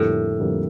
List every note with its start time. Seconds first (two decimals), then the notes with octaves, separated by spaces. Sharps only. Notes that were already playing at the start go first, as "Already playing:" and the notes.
Already playing: F2 A2 D3 G3 A#3
0.40 F2 D3 G3 A#3